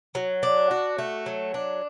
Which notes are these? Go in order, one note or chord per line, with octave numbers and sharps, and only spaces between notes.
F#3
D4
F#4
A3
F#3
D4